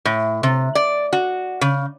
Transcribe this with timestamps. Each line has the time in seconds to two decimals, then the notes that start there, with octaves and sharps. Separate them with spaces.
0.05 A2
0.43 C3
0.75 D5
1.13 F#4
1.61 C#3